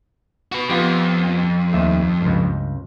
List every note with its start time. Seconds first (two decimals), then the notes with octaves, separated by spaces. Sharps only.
0.52 F#4 B4
0.70 F2 B3 F4 G4
1.73 D#2 A3 E5
2.21 C#2 G2